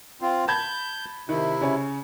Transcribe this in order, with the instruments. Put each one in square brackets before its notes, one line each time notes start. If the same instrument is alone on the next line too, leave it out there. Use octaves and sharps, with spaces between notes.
[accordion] C4 F4
[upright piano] A5 B5 G#6 [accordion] G6
[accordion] C3 E4 [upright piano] D#3
[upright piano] C#3 C#4